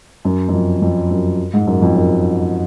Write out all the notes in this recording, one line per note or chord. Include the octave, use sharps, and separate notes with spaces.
F#2
F#2
F2
F2
F#2
G#2
F#2
F2
F#2